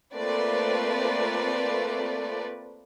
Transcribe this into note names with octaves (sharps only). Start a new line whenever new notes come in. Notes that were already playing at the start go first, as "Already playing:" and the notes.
A3 A#3 C4 F4 B4 D5